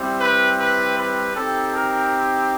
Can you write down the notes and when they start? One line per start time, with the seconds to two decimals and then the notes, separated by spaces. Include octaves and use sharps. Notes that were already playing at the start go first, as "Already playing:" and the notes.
Already playing: G3 C4 E4
0.19 B4
0.57 B4
0.96 B4
1.35 C4 D#4 G4 A4
1.73 A#4